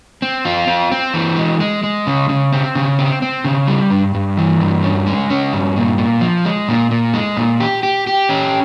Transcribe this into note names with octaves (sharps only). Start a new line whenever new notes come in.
C4
F4
C4
C4
E3
G#3
G#3
G#3
C#3
C#3
C4
C#3
C4
C4
C#3
G3
G2
G2
E3
G2
C#4
G#3
C#4
G2
A#2
A#2
F3
G#3
A#2
A#2
G#3
A#2
G4
G4
G4
C#4